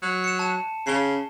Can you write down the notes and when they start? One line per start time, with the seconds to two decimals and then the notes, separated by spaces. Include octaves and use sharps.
0.02 F#3
0.24 C#7 E7
0.39 A5 E7
0.87 C#3 C7 G7